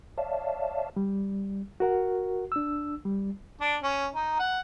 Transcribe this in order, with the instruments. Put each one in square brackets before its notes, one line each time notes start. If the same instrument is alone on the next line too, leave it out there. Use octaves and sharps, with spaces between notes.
[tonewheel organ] C#5 D5 E5 F5 A5
[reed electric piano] G3
F#4 A#4 F#5
D4 E6
G3
[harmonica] D4
C#4
D#4
F#5